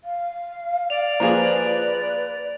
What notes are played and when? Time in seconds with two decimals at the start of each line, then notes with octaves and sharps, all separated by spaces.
0.04 F5
0.90 D5 F7
1.20 F3 A#3 G#4 B4 A#5 F7